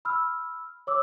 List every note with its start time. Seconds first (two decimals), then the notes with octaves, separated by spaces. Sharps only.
0.05 B5 E6 F6
0.87 C#5 D6 E6